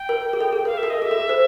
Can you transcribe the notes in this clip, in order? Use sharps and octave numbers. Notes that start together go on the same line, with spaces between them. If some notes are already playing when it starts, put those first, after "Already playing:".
Already playing: G5
A#4
G#4
A4
G#4
A#4 F5
E5
A4
D#5
G#4 E5
A4
C5